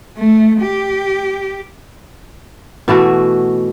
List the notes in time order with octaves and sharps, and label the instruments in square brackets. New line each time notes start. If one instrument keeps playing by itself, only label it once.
[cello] A3
G4
[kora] B2 E3 A3 F#4